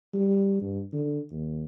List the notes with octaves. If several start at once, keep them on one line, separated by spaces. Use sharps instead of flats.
G3
G2
D3
D#2